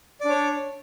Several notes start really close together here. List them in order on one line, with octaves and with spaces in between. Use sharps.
D5 D4 C#5